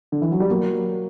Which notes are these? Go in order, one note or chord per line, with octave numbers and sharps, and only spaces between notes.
D3
E3
F#3
G3
F#3 A#3